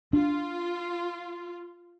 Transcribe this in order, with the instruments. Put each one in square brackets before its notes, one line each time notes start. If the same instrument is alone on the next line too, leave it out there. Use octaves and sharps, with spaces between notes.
[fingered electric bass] D4 [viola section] F4